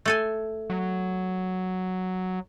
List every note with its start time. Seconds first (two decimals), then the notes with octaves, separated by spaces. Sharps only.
0.05 A3 A4 G#5
0.70 F#3